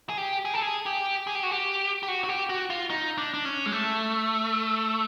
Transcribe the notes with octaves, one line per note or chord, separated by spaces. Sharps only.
G#4
G4
G#4
A4
G#4
G4
G#4
G4
F#4
G4
G4
F#4
F#4
G4
F#4
F4
D#4
D4
D4
C#4
G#3
A3